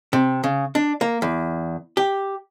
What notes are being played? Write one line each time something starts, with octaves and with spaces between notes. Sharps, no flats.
C3
C#3
D4
A#3
E2
G4